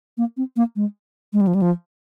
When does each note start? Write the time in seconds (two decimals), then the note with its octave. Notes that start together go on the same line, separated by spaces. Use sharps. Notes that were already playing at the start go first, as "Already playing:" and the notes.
0.18 A#3
0.37 C4
0.56 A#3
0.76 G#3
1.33 G#3
1.41 G3
1.47 F3
1.55 G3
1.62 F3